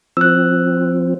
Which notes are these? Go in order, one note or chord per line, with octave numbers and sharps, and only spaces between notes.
F3 C4 E6 F#6